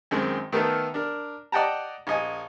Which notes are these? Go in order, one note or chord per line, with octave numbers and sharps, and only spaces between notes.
F#2 D#3 G#3 C4
D#3 A3 B3 D#4 A4 A#4
D4 A#4
D5 D#5 F#5 G5 A5 A#5
A#1 D#5 G#5